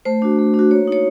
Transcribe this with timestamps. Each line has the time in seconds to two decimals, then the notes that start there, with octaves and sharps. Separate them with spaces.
0.05 A3 C5
0.22 D4 F#4
0.39 A3
0.54 D4 F#4
0.71 A#3 C#5
0.88 D#4 F#4 C#5